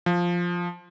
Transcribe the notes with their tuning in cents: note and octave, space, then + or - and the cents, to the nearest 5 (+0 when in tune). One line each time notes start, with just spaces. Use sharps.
F3 +0